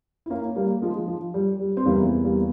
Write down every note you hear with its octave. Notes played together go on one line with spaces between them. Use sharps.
E4
A#3 C#4
G3 A#3
F3 G#3
F3
G3
G3
C4
E2 C3 E3 G3 A#3
G3 A#3